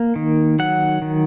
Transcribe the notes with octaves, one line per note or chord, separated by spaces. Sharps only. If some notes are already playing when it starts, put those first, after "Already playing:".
Already playing: A#3
D#3
F#3 F#5
D#3